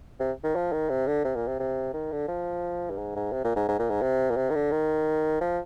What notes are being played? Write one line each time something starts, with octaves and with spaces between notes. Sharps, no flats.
C3
D#3
F3
D#3
C3
D3
C3
A#2
C3
C3
D#3
D3
F3
G2
G#2
G#2
C3
A#2
G#2
G#2
A#2
G#2
C3
A#2
C3
D#3
D3
D#3
F3